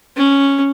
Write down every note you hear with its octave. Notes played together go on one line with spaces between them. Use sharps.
C#4